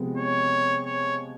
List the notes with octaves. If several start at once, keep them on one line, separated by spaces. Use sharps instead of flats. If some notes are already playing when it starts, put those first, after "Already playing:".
Already playing: C3 F3 G#3 B3
C#5
C#5